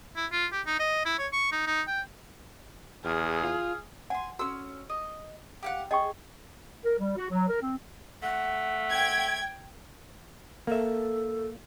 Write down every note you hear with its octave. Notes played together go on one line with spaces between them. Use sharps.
E4
F4
G4
D#4
D#5
E4
C#5
C#6
D#4
D#4
G5
E2 G#4 F6
F4
F#5 G#5 C6
C#4 F#4 A4 E6
D#5
G4 F5 F#5
G#4 D#5 G5 C#6
A#4
G3
F#4
F#3
A#4
C4
A3 F#5
G5 G#6
A#3 A4 E5